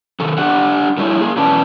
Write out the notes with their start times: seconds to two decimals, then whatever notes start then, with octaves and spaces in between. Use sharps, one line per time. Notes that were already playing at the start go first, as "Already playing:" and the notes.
0.20 C3 D#3 A4
0.38 D4 G4 F#5
0.97 D3 G3 D#4 E4 C#5
1.19 A#3 G#4
1.37 B2 E3 C#4 B4 D5 A5